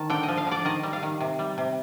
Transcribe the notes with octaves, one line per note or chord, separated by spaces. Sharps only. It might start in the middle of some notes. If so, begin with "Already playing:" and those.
Already playing: D#3 A5
D3 G5
D#5
F3
F5
D3 D5
D#3 D#5
G3
F5
D#3
C3
G3
C3